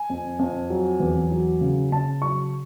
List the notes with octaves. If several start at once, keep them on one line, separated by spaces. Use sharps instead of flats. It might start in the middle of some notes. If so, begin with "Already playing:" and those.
Already playing: G#5
F2
F2
F#3
E2
F#3
C#3
C#3 A5
F#3 C#6